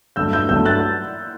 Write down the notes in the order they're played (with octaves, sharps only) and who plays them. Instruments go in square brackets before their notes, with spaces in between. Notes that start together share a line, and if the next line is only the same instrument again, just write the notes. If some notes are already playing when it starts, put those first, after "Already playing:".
[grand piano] G2 F#3 A3 [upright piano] E6 G6
[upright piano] E6 G6
[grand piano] G2 F#3 A3 [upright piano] E6 G6
[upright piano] F#6 A6